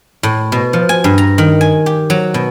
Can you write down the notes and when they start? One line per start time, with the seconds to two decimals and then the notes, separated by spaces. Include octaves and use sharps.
0.23 A2
0.52 B2
0.73 F3
0.89 G#5
1.04 G2
1.18 A#5
1.38 D#3
1.61 G#5
1.86 G4
2.10 F#3
2.34 B2